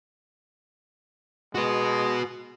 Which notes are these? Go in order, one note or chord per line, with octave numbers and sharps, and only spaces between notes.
G#3 F#4 B4